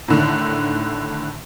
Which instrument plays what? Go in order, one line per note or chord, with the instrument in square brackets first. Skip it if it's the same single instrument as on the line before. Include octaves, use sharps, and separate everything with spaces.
[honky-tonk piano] A2 D3 D#3